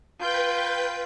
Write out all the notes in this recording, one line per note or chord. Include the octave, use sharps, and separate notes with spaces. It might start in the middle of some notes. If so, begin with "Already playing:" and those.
F4 B4 G5 G6